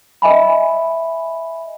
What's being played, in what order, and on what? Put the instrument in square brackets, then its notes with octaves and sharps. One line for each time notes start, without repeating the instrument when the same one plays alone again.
[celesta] D#5 E5 G#5 B5